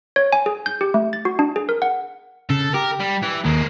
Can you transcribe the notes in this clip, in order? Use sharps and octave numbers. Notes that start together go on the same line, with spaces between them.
C#5
G#5
G#4
G6
G4
A3
A6
F#4
D4
G#4
A#4
F#5
C#3 A4
G4 A#4
G3
E3
D#2 G#3 A#3